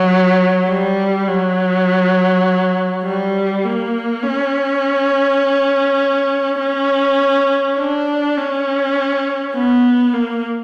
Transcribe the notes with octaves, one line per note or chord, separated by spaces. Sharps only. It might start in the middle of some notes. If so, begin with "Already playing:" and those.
Already playing: F#3
G3
F#3
G3
A#3
C#4
C#4
D4
C#4
B3
A#3